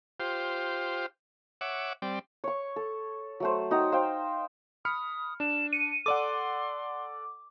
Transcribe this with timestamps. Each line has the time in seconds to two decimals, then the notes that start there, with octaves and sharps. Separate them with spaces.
0.20 F4 G4 C5
1.61 C#5 E5 F#5 D6
2.02 G3 C4 D5
2.44 C#5 C#6
2.76 A4
3.40 F#3 A3 C5
3.71 F#3 D#4 G5 A#5
3.92 C5 F5 G5
4.85 B5 D#6 F6 C#7
5.40 D4 E7
5.73 C#7 D#7
6.06 A4 D5 F#5 C6 D6